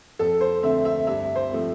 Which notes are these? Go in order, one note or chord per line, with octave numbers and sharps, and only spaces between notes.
F2 A4
C5
D3 A3 C4 E5
E5
G2 E5
C5
F3 A3 C4